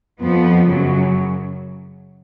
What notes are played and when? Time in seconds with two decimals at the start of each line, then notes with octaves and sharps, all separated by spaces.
0.20 F2 F3 B3
0.67 F#2 C#3 F#3